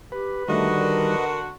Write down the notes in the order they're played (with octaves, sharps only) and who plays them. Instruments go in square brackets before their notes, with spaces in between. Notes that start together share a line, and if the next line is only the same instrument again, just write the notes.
[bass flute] G4 [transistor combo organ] B4
[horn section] D3 F#4 [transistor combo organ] D#3 G3 [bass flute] A3 [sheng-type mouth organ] B4 D#5
[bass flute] A#4